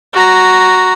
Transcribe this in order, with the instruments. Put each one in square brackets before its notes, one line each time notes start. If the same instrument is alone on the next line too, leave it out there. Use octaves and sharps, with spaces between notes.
[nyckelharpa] F#4 A#5